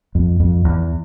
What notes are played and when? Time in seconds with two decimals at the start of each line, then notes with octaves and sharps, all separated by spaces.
0.15 F2
0.40 F2
0.65 E2